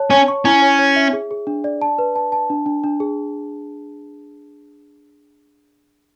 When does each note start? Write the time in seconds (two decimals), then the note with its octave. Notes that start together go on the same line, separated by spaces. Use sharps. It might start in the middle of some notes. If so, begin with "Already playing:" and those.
Already playing: C#5 A5
0.10 C#4 C#5
0.28 C#6
0.45 C#4 E4
0.62 C#5
0.79 C#5
0.96 E5
1.13 G#4
1.31 G#4
1.47 D4
1.64 D5
1.82 A5
1.99 B4
2.16 A5
2.32 A5
2.50 D4
2.66 D4
2.84 D4
3.00 G#4